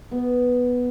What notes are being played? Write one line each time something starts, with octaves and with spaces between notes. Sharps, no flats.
B3